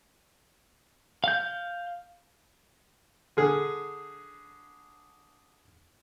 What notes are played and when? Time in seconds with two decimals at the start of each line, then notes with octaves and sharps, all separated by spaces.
1.24 F5 G6
3.37 D3 G#4